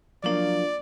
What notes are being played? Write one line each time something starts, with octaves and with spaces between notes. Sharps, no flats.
F3 F#3 A#3 D4 F4 D5